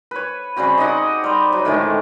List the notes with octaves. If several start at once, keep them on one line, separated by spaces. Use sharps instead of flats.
B4 C#5
C#3 G3 C4 F#4
D#4 G4 D#5 F#5
G3 C5
F#3
A2 D3 D#3 G#3